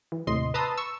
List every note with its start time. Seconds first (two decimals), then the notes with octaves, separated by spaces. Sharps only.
0.12 E3
0.27 D#2 A2 C3 D#5 C6
0.54 B4 A5 A#5 C6 D#6 E6
0.78 C#6 E6